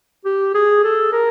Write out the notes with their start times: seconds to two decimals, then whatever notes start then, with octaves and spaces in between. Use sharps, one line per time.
0.25 G4
0.54 G#4
0.84 A4
1.13 A#4